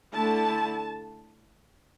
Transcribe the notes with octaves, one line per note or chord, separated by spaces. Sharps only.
D3 A3 E4 A5